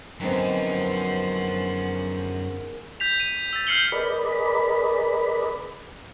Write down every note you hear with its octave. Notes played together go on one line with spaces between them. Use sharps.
F#2 D3 D#3 F3 G#3 B3 C4 F#5
G6 B6 F7
D#7
F7
E6 A6
F6 G6 C7 C#7 F#7 G7
G#4 A#4 B4 D5 D#5 B5